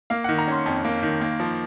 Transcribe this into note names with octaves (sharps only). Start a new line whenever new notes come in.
A#3 F5
D#3 F#5
A#5
C#4 C6
F2
A#3
D#3
A#3
F3